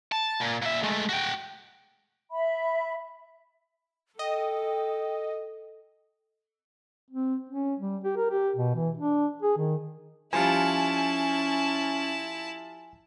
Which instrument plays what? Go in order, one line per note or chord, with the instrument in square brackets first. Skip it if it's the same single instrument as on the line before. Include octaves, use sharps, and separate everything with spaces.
[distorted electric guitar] A5
A#2
A#2 E5
G#3 A3
F#4 G5
[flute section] E5 B5
[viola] A4 [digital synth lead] D#5 [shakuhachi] G5
[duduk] C4
C#4
G3
G4
A#4
G4
B2
E3
D4
G#4
D#3
[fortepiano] F3 G3 F4 [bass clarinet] C#4 [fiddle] E4 A5 [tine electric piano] G#5